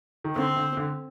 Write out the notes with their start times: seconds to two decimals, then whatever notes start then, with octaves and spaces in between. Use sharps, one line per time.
0.24 D#3
0.35 D3 C4
0.57 D3
0.77 D3